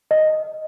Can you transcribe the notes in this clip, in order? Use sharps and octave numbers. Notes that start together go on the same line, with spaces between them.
D#5